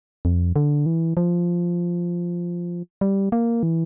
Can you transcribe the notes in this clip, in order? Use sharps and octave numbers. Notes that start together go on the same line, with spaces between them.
F2
D3
E3
F3
G3
A#3
E3